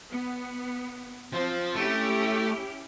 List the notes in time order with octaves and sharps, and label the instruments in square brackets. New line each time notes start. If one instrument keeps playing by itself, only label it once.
[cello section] B3
[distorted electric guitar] F3 [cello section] C4 C5
[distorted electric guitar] A3 [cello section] C#4 E4 G4